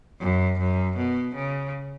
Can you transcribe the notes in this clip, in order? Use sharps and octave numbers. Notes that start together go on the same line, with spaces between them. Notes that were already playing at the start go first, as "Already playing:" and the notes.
F#2
F#2
B2
C#3